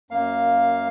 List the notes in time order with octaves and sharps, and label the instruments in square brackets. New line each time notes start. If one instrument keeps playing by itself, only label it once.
[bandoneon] F#2 A#3 F5